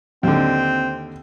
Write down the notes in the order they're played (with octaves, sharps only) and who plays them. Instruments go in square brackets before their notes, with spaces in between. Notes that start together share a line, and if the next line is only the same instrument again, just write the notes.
[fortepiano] D#2 D3 [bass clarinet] C4